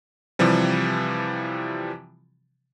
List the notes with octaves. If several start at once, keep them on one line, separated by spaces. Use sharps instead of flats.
C3 E3 F3 G3